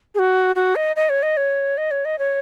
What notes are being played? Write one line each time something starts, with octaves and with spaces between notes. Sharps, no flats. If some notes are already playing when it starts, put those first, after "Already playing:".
G#4
F#4
F#4
D#5
D#5
C#5
D#5
C#5
D#5
C#5
D#5
C#5